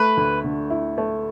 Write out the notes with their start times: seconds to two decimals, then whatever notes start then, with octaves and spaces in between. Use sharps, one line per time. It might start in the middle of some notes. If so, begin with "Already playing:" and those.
Already playing: A3 B4
0.17 D2
0.44 D3
0.70 E4
0.98 A3